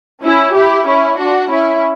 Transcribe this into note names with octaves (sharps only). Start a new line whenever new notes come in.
C#4 E4
E4 G4
C#4 E4
D4 F#4
C#4 E4